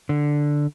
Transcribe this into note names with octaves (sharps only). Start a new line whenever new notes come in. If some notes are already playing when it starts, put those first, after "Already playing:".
D3